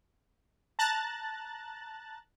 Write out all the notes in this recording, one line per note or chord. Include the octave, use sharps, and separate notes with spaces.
A5 A#5 F#6 A6